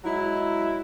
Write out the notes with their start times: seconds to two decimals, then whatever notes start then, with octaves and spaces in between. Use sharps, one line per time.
0.05 F#3 G#3 E4